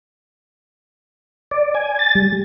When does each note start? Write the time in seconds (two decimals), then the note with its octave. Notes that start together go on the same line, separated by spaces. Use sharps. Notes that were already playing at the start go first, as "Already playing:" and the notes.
1.51 D5
1.74 G#5
1.99 A6
2.15 G3